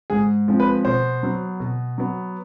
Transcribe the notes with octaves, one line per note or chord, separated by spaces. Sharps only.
G#2 G#4
F3 G#3 C4
B4
B2 C5
F#3 B3
B2
F#3 B3